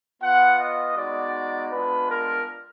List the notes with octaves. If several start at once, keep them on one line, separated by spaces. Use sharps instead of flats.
B3 F4 F#5
D#5
G#3 B3 D#4 F#4 D5
G#3 B3 D4 F4 B4
A#4